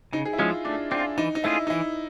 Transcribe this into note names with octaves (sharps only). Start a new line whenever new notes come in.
C#3 D#4
G#4
E4
F3 G#3 C#4 F4
A3 D4
C4 D4 F4
E3 D#4
D#4
A3 C#4 E4 F4 G#4
D#4
E3 E4